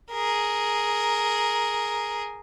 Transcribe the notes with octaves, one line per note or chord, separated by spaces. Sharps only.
G#4 A#4